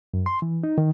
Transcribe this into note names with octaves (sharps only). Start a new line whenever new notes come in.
F#2
C6
E3
D#4
D#3